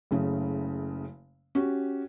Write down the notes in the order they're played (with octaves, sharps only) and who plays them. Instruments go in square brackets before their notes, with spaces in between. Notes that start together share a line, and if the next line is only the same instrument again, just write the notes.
[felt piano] F#1 C#3 A3
C#4 F#4 G4